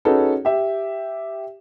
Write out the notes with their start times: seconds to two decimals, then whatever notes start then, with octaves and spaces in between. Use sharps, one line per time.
0.05 C#4 D#4 F#4 G#4 A4 B4
0.45 G4 E5